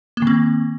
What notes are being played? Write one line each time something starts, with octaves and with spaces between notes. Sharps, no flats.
D#3 A#3 C4